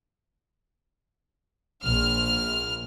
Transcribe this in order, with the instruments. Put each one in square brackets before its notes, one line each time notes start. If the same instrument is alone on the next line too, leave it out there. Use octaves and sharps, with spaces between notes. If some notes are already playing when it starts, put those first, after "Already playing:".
[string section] A#1 F6